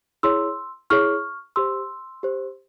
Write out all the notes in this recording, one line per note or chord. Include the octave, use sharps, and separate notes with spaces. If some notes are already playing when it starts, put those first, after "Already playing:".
E4 G#4 C#5 C6 E6
E4 G#4 C#5 C#6 F6
G4 C5 C6 E6
G4 C5